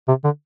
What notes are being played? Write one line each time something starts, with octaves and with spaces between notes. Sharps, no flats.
C3
D3